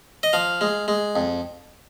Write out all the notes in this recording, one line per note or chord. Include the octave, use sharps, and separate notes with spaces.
D#5
F3 F5
G#3
G#3
F2